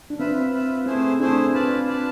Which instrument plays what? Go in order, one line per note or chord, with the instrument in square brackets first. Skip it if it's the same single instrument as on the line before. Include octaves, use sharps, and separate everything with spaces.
[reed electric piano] D4
[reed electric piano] C4 [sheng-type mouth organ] F4 B4 E5
[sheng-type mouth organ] F4 B4 E5
[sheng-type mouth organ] A3 E4 G#4 C5 [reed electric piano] C4
[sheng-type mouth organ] A3 E4 G#4 C5 [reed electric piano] D4
[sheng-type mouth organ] F4 B4 D5 A5
F4 B4 D5 A5